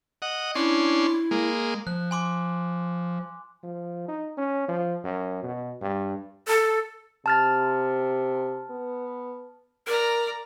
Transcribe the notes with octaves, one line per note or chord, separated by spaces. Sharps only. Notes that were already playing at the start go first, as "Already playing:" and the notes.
D#5 F#5
C#4 D4 E4 C6
G#3 A#3
F3 F#6
G#5 C6 D6
F3
D#4
C#4
F3
F#2
B2
G2
A4
C3 A5 F6 A6
B3
A#4 D5 A#5